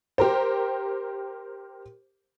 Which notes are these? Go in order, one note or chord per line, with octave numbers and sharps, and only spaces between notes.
G4 A#4 C5